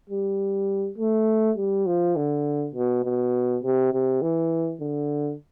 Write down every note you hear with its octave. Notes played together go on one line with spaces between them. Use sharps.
G3
A3
G3
F3
D3
B2
B2
C3
C3
E3
D3